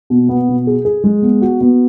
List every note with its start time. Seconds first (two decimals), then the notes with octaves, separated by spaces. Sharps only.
0.10 B2
0.29 B3
0.48 B2
0.67 G#4
0.85 G#4
1.04 G#3
1.22 B3
1.42 F#4
1.61 B3